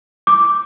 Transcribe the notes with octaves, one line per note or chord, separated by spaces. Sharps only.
D6